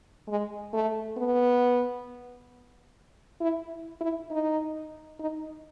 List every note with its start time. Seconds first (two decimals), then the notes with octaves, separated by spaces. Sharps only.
0.28 G#3
0.73 A3
1.17 B3
3.41 E4
4.01 E4
4.31 D#4
5.20 D#4